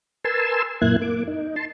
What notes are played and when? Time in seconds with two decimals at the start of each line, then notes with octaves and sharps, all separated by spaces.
0.24 A#4 B4 G#5 A5 C6 E6
0.82 F#2 A#2 A#3 E4 F#6 G#6
1.02 A#3 D6
1.28 D#4
1.56 A5 C6